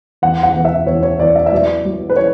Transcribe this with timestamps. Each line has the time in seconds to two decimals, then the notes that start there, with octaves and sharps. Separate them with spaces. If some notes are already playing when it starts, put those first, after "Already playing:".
0.22 E2 F#5
0.43 F#5
0.55 E2
0.65 E5
0.86 E2 C#5
1.03 C#5
1.19 E2 D5
1.36 E5
1.46 E5
1.52 F#3 D5
1.85 F#3
2.10 B4
2.16 C#5